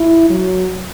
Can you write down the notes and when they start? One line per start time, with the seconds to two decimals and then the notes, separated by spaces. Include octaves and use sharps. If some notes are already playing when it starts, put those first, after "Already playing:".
Already playing: E4
0.30 F#3